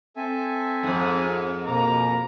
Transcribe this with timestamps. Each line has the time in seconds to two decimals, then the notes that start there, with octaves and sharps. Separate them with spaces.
0.16 C4 A4 E5 G#5
0.83 F2 G#2
1.66 B2 A#3 A#5 D6